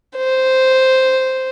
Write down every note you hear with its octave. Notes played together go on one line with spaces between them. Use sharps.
C5